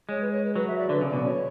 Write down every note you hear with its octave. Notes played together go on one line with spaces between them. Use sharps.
G#3 C#5
B4
C#5
B4
F#3 B4
E5
D5
D3 B4
C#3
D5
B2
C#5